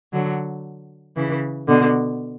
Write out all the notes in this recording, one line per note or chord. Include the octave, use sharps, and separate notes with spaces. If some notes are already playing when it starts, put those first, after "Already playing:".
D3 F#3
C#3 E3
B2 D3